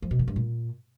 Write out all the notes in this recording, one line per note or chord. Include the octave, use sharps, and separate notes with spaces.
F3
B2
D#3
G2
A#2